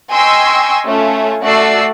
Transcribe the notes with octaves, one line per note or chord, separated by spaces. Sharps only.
D#5 G5 G#5 C6 C#6 E6
A3 C#4 F4
A3 F#4 D5 E6 C7